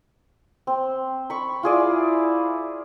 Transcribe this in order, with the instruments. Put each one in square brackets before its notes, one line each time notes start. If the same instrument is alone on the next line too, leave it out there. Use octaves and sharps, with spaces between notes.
[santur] C4
B5 C#6
[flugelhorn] E4 [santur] F4 G#4 D5